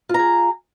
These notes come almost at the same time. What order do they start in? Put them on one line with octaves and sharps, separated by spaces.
F4 A#5 G#4